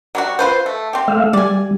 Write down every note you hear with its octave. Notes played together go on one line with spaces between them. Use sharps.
F#3 G3 F#4
F4 B4 C5
A3
C4 G4
A3 E5 F5
G3 D5 G#5